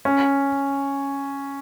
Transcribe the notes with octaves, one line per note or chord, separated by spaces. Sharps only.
C#4